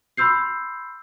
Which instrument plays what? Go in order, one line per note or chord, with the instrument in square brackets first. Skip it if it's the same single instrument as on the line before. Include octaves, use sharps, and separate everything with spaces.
[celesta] B5 C6 E6 G6 C7